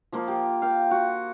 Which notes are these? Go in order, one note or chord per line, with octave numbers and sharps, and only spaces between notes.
F3 A#3 F4
G4
F5 G5
F#4